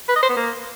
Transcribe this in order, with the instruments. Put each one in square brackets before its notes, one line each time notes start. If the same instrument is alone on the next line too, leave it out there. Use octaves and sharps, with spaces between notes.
[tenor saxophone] B4
D#5
C5
B3
A#3